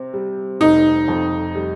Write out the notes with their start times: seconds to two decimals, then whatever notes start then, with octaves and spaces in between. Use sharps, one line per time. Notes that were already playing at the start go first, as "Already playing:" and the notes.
Already playing: C3 C4
0.14 G3
0.61 F1 D#4
1.08 F2
1.55 G3